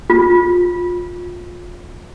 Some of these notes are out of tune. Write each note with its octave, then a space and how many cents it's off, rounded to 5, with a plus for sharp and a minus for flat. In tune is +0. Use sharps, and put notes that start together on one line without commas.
F4 +20